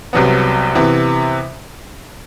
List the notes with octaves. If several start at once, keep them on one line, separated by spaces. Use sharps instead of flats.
C2 C3 F#3 B3
C3 E3 B3